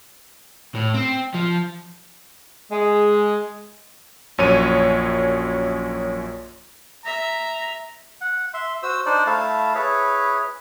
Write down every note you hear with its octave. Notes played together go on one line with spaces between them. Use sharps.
A2
C4
F3
G#3
A#1 F#2 C#5 D#7
E5 A#5
F#5
E5 C6
F#4 C5 E6
D4 D#4 C5 D5
A3 E4 F5 A5
E4 G#4 B4 C#5